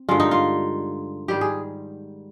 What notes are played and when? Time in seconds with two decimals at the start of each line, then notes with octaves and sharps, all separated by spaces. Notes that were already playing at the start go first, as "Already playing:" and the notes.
Already playing: C4
0.09 G2 D3 G#3 F4
0.20 D#4
0.31 F4
1.28 G#2 D#3 G3 G4
1.41 G#4